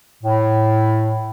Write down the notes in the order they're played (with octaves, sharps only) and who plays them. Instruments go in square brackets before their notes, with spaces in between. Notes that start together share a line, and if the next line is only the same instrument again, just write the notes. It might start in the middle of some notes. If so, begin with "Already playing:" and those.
[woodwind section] A2